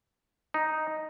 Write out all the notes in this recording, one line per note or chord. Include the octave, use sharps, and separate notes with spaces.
D#4